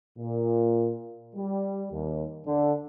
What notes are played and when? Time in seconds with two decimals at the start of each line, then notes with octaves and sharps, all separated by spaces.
0.17 A#2
1.35 G3
1.91 D#2
2.45 D3